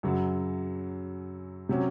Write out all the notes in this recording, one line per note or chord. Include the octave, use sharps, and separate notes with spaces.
F#2 C#3 F#3
C3 F#3 C#4